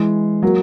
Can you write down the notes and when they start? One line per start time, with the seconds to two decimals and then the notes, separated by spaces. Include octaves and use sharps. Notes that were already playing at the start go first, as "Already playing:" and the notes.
Already playing: E3 G#3
0.42 F#3 A#3